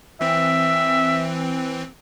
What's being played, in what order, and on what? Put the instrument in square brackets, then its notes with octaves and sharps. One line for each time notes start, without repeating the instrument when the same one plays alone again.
[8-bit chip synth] E3 C4 [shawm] E5